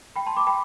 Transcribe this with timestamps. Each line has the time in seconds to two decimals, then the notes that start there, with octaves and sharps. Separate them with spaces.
0.16 G5 B5
0.26 A5 C6
0.36 B5 D6
0.47 G5 B5